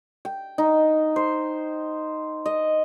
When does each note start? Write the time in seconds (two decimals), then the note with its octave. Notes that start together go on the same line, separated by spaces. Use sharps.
0.25 G5
0.58 D#4
1.16 C5
2.46 D#5